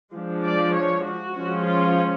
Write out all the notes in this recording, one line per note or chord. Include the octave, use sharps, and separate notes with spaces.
F3 G#3 D4
D5
C#5
F#4
F3 G#3 C#4
F4